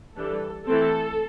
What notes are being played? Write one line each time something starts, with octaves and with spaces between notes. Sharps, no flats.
E3 G3 D4 A4
E3 A3 C4 A4